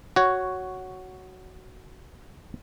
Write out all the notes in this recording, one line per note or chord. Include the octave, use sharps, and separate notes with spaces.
F#4 C#5